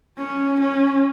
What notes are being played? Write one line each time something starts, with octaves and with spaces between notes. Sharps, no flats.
C#4
C#4